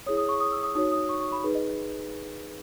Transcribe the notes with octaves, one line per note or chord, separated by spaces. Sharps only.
E4 G#4 C#5 D#6
D#6
C#6
D#6
E6
D#6
D#4 F#4 C#5 D#6
D#6
C#6
C#6
B5
D#4 G#4 B4
D#5